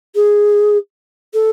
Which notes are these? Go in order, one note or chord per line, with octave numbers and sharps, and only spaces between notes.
G#4
A4